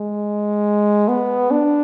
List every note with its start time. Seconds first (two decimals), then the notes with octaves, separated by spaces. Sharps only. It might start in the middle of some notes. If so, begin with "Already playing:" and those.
Already playing: G#3
1.08 B3
1.51 D4